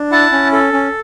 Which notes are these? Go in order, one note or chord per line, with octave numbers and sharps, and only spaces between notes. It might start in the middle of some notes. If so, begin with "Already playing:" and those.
Already playing: D4
E4 F#5 A5
C#4
A4
C#4